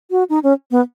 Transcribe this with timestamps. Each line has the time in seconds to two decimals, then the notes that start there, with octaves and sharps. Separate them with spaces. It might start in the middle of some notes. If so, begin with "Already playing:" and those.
0.11 F#4
0.30 D#4
0.43 C#4
0.71 B3